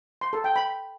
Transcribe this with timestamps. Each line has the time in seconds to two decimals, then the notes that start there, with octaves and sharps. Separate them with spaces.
0.21 C6
0.33 A4
0.44 G5
0.56 B5